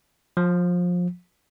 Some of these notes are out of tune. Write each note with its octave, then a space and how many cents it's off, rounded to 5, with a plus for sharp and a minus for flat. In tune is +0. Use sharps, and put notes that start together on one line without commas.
F3 +25